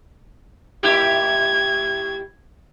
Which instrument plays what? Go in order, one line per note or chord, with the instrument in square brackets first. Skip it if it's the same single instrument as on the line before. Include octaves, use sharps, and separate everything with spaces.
[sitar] A2 E4 G4 [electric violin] G#6